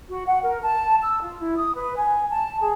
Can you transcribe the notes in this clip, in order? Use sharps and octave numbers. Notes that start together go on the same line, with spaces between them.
F#4
F#5
A#4
A5
E6
F4
E4
D#6
B4
G#5
A5
G#4